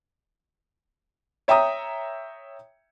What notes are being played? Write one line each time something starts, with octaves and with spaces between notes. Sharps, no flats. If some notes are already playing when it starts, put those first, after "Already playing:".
C#5 E5 G5 A#5 D#6